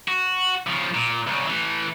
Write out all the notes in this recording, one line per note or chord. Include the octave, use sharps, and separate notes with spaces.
F#4
C#3 F3
A#2
C2 C#3
E3 A3